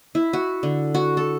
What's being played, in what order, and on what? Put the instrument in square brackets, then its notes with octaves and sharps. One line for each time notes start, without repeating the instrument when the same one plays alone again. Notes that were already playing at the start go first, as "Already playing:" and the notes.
[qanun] E4
F#4
D3
F#4
A4